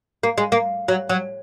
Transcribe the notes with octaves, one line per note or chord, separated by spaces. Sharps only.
A#3
G#3
A#3
F#3
F#3